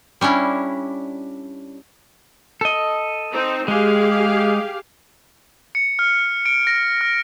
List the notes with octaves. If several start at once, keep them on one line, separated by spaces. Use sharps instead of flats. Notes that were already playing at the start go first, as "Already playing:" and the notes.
G3 C#4 D4 E4
A4 D#5
C4 D#4
G#3 G4 G#4 F5
C#7
F6
D7
A#6
F6